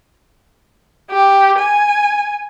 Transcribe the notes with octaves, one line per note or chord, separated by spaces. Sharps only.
G4
G#5